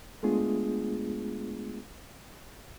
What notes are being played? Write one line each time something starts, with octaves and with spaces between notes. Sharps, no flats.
G#3 A3 B3 D4 F4 G#4